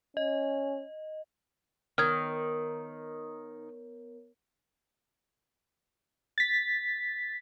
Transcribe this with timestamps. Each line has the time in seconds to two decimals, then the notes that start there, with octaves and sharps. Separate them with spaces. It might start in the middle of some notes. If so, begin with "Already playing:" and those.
0.17 C#4 D#5
1.98 D#3 B3 A#4 C#5 F6 G#6
6.38 A6 B6